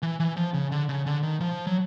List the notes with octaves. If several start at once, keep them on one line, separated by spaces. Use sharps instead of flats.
E3
E3
F3
C#3
D3
C#3
D3
D#3
F3
F#3